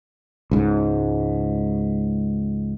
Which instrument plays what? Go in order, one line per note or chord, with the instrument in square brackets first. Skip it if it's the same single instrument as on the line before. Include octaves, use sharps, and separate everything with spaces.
[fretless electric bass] C#2 G#2